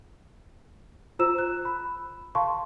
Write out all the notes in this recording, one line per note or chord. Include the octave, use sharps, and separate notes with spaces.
F4 C5 A#5 E6 E7
F#6
B5
F5 A5 C6 C#6